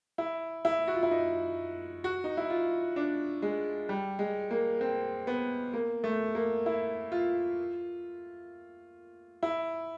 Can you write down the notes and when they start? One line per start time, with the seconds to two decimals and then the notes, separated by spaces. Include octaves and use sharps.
0.18 E4
0.65 E4
0.88 F#4
0.95 F4
1.03 E4
1.11 D#4
2.04 F#4
2.24 D#4
2.37 E4
2.50 F4
2.96 D4
3.42 G#3
3.89 G3
4.19 G#3
4.51 A#3
4.81 C4
5.27 B3
5.74 A#3
6.04 A3
6.35 A#3
6.66 E4
7.12 F4
9.43 E4